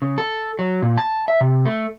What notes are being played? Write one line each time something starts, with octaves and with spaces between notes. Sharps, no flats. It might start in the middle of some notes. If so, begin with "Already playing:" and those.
C#3
A4
F#3
A#2
A5
E5
C3
A3